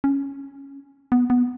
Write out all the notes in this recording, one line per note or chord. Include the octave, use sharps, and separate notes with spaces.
C#4
B3
B3